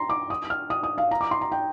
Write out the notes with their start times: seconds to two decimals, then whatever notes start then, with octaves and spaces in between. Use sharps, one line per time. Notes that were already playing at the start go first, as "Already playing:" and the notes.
Already playing: A#5 C6
0.10 D6
0.30 D#6
0.50 F6
0.70 D#6
0.83 D#6
0.98 F5
1.11 A#5
1.21 D6
1.31 C6
1.41 A#5
1.52 G5